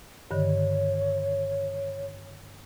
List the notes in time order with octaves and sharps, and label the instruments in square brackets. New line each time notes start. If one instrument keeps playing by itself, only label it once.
[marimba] G2 D3 D#3 [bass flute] C#5